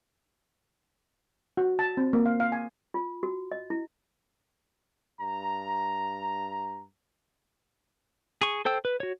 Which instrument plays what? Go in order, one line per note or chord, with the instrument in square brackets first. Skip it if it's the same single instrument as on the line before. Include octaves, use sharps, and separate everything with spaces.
[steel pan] F#4
A5
C4
A#3
F5
F5
G#5
[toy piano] F4
F#4
D#5
E4
[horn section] G2 A#5
[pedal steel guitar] G#4 C#6
A4 C5 G5 E6
B4
F#4 C#5